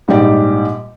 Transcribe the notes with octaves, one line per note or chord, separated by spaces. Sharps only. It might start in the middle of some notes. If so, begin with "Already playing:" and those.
A#1 G#2 G3 D#4 G4 D5